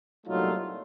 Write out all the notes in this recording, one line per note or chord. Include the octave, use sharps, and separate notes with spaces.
C2 A#2 F#3 A3 D#4 F4